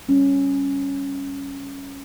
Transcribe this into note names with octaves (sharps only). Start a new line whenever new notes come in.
G3 C#4